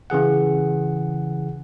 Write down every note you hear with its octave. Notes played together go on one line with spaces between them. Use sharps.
C#3 E3 G#4 F#5